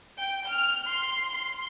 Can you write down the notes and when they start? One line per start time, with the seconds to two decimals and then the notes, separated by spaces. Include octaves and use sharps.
0.19 G5
0.50 F6
0.91 C6
1.33 C6